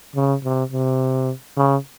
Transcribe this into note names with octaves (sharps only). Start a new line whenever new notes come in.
C#3
C3
C3
C#3